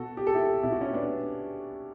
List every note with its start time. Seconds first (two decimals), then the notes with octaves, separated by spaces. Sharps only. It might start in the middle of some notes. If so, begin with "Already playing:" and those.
Already playing: B2 F#4 A4
0.17 G4
0.27 A4
0.34 E4 G4
0.63 B2 E4
0.72 F#4
0.81 C#4 E4
0.93 B3 D4